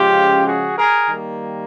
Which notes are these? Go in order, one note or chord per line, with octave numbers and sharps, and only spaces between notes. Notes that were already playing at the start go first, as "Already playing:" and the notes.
Already playing: C#3 F3 G#3 C#4 F4 G4
F#4 G#4
G#4 A#4
D#3 G3 A#3